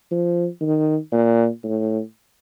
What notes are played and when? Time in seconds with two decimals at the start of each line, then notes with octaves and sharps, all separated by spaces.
0.11 F3
0.61 D#3
1.12 A#2
1.64 A2